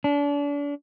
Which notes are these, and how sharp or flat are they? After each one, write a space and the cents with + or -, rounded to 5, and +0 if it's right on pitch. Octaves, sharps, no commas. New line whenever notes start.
D4 -35